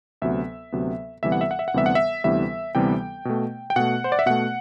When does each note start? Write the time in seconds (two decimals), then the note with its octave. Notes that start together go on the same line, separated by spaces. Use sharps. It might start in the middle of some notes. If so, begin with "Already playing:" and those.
0.22 D2 C3 F#3 B3 E5
0.72 D2 C3 F#3 B3
1.23 D2 C3 E3 G3 B3 E5
1.32 F#5
1.41 E5
1.51 F#5
1.59 E5
1.68 F#5
1.74 D2 C3 E3 G3 B3 E5
1.86 F#5
1.95 E5
2.24 D2 C3 E3 G3 B3 E5
2.75 D2 C3 E3 G3 B3 G5
3.25 B2 A3
3.70 G5
3.76 B2 A3 F#5
4.04 C5
4.12 D5
4.19 E5
4.26 B2 A3 F#5